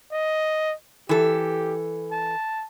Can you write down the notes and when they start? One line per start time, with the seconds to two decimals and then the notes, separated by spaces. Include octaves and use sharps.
0.12 D#5
1.09 E3 G4 A4
2.11 A5